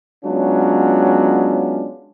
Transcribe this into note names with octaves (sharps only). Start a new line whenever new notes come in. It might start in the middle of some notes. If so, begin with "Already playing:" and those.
F#3 G#3 B3 C#4 D4 F4